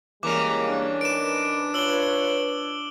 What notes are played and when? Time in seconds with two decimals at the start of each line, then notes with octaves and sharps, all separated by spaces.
0.23 E3 G3 G#3 A#3 C#4 A#4 A#5 D6
0.68 D4
1.01 D#4 A#4 B4 D7 E7
1.74 F4 B4 C#5 E6 F#7 G7